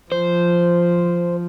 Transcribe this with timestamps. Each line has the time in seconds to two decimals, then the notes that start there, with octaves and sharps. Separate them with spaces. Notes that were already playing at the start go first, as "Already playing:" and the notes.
0.12 F3 C5